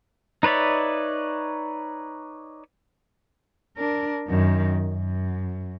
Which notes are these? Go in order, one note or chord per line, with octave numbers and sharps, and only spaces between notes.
D#4 B4 C#5 D5 E5
D4 A#4
F#2 D#3
F#2